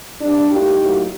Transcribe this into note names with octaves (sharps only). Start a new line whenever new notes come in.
C3 G3 A#3 D4
A2 G3 A#3 D#4 G4
A2 F#3 A#3